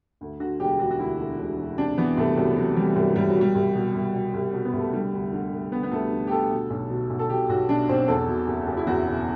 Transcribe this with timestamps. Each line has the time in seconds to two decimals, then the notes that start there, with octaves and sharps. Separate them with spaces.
0.21 D2
0.40 D3 F#4
0.60 E1 G4
0.79 E1 F#4
0.91 F#4
0.99 D2 E4
1.19 D3
1.39 E1
1.58 E1
1.78 C3 D4
1.98 E3 B3
2.17 C2 A3
2.37 C2 F#3
2.56 C3 F#3
2.76 E3 G3
2.96 C2 F#3
3.16 C2 G3
3.29 F#3
3.35 B2
3.41 G3
3.55 C2
3.75 B2
3.95 C2
4.14 B2
4.34 C2
4.53 B2
4.65 B3
4.74 C2
4.79 A3
4.93 D3 G3
5.13 D2
5.33 D3
5.52 D2
5.72 D3 B3
5.83 B3
5.92 D2 A3
6.11 D3
6.27 G4
6.31 D2 A4
6.51 B2
6.70 B1
6.90 B2
7.10 B1
7.19 A4
7.30 B2 G4
7.49 B1 F#4
7.69 B2 D4
7.89 B1 C4
8.08 E2 A4
8.28 B2
8.48 F#1
8.67 F#1
8.77 E4
8.87 E2 F#4
9.07 B2